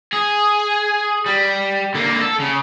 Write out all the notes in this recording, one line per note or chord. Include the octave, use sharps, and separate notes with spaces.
G#4
G3
D3 A#3
A4
C#3